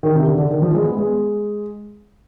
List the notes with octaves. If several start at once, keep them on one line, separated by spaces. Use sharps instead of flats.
D#3
C3
D3
D3
D#3
F3
G#3
B3
G#3